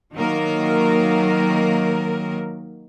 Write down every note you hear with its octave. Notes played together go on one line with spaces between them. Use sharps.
D#3 F#3 A#3 A#4